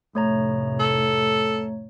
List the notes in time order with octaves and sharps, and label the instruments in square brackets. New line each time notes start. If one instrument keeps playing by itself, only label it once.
[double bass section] F1 A2 [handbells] A3 C#5 A#5
[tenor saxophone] A4